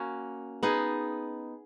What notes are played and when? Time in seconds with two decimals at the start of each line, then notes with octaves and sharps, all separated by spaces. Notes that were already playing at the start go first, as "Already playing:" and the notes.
Already playing: A#3 C#4 F#4
0.63 B3 D#4 G#4